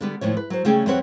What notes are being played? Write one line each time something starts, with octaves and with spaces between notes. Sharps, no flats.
D3 G3 B3
D#2 A2 E3 F3 C#5
B4
F#3 C5
C#3 G3 A3 C#4 G#4 G5
F2 G3 C4 B4 C#5 F#5